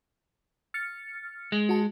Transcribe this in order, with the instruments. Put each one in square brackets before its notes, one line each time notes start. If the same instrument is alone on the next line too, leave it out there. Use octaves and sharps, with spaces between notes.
[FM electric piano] F6 A6 C#7
[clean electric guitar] G#3
[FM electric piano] F#4 A5